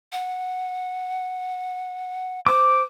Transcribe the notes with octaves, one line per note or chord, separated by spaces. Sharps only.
F#5
C5 D6